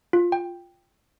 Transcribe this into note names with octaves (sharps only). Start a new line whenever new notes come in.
F4
G5